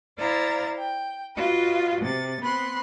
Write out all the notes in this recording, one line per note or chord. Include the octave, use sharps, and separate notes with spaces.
E4 C5 D5 F5 A#5 A6
G5
F4 F#4 B4 D#5
C3 A6
B3 C4 B5 C6 F#6